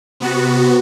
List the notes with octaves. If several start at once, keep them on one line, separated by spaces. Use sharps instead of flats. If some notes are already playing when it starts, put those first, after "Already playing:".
C3 B3 F#4